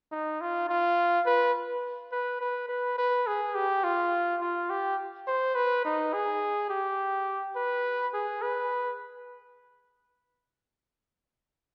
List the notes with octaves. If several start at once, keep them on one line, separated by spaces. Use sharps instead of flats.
D#4
F4
F4
B4
B4
B4
B4
B4
G#4
G4
F4
F4
G4
C5
B4
D#4
G#4
G4
B4
G#4
B4